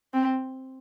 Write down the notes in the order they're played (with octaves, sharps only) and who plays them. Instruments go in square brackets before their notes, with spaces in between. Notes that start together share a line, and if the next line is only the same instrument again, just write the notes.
[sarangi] C4